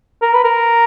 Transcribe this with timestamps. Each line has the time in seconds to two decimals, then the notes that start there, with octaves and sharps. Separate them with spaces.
0.22 A#4
0.34 B4
0.44 A#4